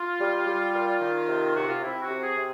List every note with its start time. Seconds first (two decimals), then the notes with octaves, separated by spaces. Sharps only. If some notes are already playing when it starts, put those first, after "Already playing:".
Already playing: F4
0.20 G3
0.47 G3
0.73 A#2
1.00 D#3
1.28 C3
1.55 C3 F#4
1.68 F4
1.81 C3 E4
2.02 F#4
2.09 C3
2.22 G#4
2.36 C3